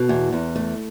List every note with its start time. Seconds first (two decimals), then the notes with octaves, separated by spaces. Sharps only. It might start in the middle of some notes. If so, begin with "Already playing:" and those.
Already playing: B2 A4
0.09 E2
0.32 E2
0.56 A3